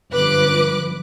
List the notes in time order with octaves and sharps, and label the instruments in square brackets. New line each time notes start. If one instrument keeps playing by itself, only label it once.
[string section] G1 F#2 F3 B4 D6 F#6